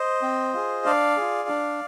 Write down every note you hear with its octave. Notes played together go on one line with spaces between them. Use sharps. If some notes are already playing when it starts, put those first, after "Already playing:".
Already playing: C5 D#5
C4
F4 G#4
D4 D5 F5
F4 G#4
D4